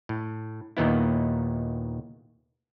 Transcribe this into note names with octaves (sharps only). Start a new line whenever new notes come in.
A2
D#2 A#2 D#3 B3 E4